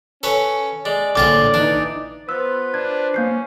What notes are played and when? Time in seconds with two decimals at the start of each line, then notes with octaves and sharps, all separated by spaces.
0.23 C#4 A4 B4 C#5
0.85 G#3 D5
1.16 A#1 A2 D3 F4 G#4 D6 A6
1.54 E3 D4 D#4 D7
2.29 B3 F4 B4 C5 E6
2.74 D4 G#6
3.14 A#3 C#4 G6 C7